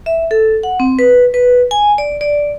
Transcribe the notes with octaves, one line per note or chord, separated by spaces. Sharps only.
E5
A4
F#5
C4
B4
B4
G#5
D5
D5